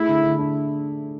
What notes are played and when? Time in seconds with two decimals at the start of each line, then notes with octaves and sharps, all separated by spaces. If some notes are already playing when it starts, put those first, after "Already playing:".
Already playing: A3 E4 G#4
0.08 D3
0.24 D3
0.38 D4